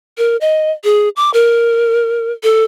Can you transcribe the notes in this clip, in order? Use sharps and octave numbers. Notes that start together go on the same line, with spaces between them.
A#4
D#5
G#4
D6
A#4
A4